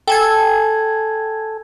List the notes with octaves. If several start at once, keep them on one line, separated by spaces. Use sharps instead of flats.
A4 G5 G#5 G#6